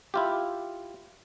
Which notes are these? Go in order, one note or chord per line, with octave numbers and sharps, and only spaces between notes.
E4 F4 G4